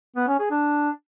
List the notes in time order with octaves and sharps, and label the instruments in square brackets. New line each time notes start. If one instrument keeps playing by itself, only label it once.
[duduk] B3
C#4
G#4
D4